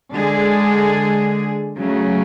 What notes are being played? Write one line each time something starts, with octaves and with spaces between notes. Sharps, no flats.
D3 G#3 D4 G#4
C#3 F#3 A3